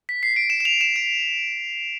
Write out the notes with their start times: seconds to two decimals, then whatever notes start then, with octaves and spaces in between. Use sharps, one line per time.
0.09 B6
0.23 C7
0.36 D7
0.50 E7
0.60 E7
0.65 F7
0.81 E7
0.96 D7